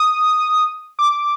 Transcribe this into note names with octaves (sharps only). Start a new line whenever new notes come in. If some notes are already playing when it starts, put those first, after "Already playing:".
Already playing: D#6
D6